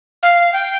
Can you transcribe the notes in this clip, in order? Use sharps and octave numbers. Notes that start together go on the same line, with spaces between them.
F5
G5